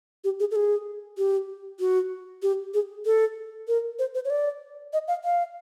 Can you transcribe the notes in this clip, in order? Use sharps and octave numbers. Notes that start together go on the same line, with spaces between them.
G4
G#4
A4
G#4
G4
F#4
G4
G#4
A4
A#4
C5
C5
C#5
D5
D#5
F5
F5